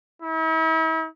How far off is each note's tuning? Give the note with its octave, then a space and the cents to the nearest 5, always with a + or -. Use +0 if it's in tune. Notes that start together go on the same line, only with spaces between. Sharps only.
E4 -45